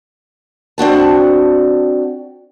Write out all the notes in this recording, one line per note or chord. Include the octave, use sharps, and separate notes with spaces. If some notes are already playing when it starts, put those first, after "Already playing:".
C4 D4 F#4 A5